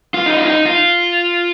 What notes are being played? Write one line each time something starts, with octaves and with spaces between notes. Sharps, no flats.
F4
D#4
F4
D#4
F4